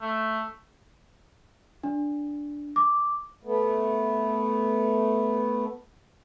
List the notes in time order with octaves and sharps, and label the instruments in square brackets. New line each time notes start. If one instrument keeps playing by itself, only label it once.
[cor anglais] A3
[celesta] D4
D6
[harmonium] A3 B3